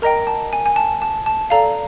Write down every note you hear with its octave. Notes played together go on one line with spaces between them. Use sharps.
A#4 D#5 G5 A#5
A5
G#5
G#5
A5
A5
A5
A4 D5 F5 A#5